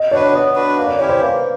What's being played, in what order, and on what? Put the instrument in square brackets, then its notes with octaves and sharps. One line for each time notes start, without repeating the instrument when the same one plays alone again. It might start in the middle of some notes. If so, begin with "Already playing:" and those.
Already playing: [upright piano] D#5
[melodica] D4 F#4 B4 [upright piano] C#5
[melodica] B3 [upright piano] C#5
[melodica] D4 F#4 B4
A#3
[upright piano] D5
[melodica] C#4 E4 G4 [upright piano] C#5
[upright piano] C5
[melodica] A#3 [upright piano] B4